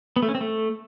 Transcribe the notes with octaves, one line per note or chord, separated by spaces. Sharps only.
B3
A3
C#4
C4
A3